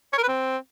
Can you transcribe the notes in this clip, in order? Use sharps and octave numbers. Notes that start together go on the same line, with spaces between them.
C#5
A#4
B4
C4